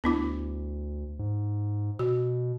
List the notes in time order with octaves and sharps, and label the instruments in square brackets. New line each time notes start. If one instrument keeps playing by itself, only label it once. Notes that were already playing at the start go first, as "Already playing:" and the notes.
[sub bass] D2 [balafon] B3 D4 E4
[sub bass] G#2
[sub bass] B2 [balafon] F#4